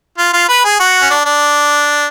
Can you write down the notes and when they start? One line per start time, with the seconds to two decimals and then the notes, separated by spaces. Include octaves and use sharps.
0.18 F4
0.33 F4
0.48 B4
0.65 G#4
0.80 F#4
1.02 C#4
1.10 D4
1.26 D4